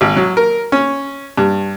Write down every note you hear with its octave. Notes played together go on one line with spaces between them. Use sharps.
G#1
F#3
A#4
C#4
G2